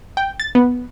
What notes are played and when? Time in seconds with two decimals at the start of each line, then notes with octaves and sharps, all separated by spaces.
0.17 G5
0.40 A6
0.55 B3